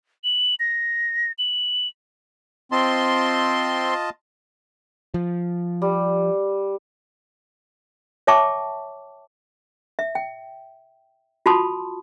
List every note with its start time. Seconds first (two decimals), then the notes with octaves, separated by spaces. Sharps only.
0.24 F#7
0.60 A#6
1.39 F#7
2.72 C4 F4 D#5 A5 C6
5.14 F3
5.82 G3
8.27 C#5 E5 G5 A5 C#6 D6
9.99 E5
10.15 G5
11.46 F4 F#4 A5 B5 C6 D#6